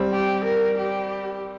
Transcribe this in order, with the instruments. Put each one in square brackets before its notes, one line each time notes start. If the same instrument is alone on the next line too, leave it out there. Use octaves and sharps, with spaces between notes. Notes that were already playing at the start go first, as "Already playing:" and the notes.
Already playing: [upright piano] G3 C4
[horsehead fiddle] G4
A#4
G4